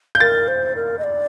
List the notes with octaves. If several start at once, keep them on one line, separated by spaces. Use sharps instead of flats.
G6
A#4 A6
C5
A#4
D#5
D5